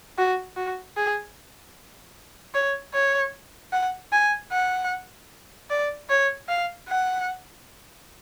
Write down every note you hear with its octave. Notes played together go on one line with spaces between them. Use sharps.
F#4
F#4
G#4
C#5
C#5
F#5
G#5
F#5
D5
C#5
F5
F#5